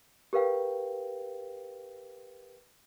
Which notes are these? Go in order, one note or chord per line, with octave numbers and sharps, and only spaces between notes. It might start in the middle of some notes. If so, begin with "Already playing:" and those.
G4 A#4 B4 F5 G5